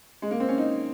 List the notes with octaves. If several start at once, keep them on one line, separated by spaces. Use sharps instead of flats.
G#3
A#3
C4
C#4
D#4